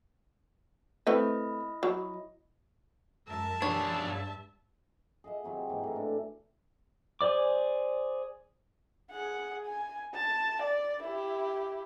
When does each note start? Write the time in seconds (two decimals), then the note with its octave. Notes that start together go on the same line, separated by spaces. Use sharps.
1.07 A3 C4 E4 B4 D#5
1.83 F#3
3.28 F#2 G#3 A#4 E5 A5
3.62 E3 D4 G4 G#4 C#5
4.00 G2 G3
5.24 G#4 D#5 E5 F#5
5.44 C3 F#3 C4
5.69 G#2 E3 A#3
5.83 A2 A#5
5.96 D4
7.21 G#4 C5 D5 D6
9.11 G#4 F#5
9.66 G#5
10.15 A5
10.62 D5
11.04 E4 G4